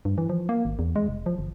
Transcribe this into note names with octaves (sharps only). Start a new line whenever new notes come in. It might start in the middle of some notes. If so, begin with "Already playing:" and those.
G2
E3
F3
A#3
G#1
E2
G#3
F1
F3
G1